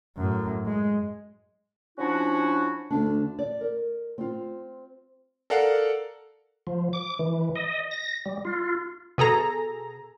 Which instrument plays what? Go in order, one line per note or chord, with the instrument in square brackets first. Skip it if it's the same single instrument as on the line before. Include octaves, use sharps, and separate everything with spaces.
[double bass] F#2 A2
G#3
[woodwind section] F3 C#4 D4 E4 F#4
[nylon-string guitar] D2 D4
D5
A#4
C4 F4
[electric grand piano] A4 A#4 D5 F5 F#5
[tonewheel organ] F3
D6
E3
D#5
A#6
G3
F4
[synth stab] B2 G#4 A4 A#5